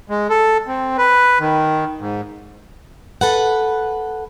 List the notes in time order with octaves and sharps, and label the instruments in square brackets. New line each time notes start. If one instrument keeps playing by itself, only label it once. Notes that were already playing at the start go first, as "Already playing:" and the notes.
[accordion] G#3
A4
C4
B4
D#3
G#2
[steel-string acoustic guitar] A4 B4 F#5